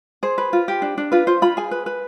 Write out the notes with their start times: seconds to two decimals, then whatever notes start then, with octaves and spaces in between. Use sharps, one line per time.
0.23 G#4 C5
0.38 B4
0.53 F4
0.68 G4
0.82 D4
0.98 D4
1.12 F4 B4
1.27 F4 C5
1.42 F4 B5
1.57 G#4 G#5
1.71 B4
1.86 B4